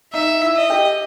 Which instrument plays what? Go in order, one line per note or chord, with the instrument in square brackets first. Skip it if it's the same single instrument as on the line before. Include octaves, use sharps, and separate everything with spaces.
[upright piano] D#4 [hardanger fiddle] E5
[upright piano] E4
[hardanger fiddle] D#5
[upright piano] G4